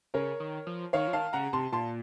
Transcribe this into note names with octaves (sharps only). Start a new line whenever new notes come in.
C#3 A#4 C#5
D#3
F3
D#3 C#5 F5
F3
D#3 F5 A5
C#3 F#5 A#5
C3 A5 C6
A#2 A5 C6